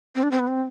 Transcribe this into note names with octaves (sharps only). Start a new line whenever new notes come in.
C4
D4
C4
B3
C4